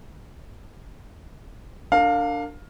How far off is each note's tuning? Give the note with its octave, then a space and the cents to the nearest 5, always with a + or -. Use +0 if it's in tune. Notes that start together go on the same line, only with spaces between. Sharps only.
D4 +0 A#4 -35 F5 +15